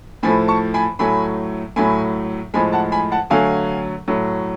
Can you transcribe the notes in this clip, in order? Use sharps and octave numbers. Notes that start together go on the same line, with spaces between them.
A2 F3 A3 G#5 B5
A5 C#6
G#5 B5
A2 F#3 A3 G#5 B5
A2 F#3 A3 G#5 B5
A2 F3 G#3 G#5 B5
F#5 A5
G#5 B5
F#5 A5
D3 F#3 A3 F5 G#5
A2 F#3 A3